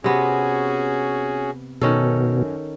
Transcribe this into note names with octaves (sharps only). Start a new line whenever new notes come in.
C3 B3 C#4 F#4 G#4
F#2 B2 D#3 C#4 A4